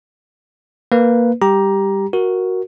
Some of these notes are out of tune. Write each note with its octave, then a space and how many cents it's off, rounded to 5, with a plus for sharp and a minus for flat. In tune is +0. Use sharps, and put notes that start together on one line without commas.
A#3 +0 B4 +0
G3 +15 G4 +0 A#5 +15
F#4 +0 A#4 +5